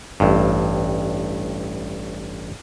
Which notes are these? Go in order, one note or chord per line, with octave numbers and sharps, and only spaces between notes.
A1 G2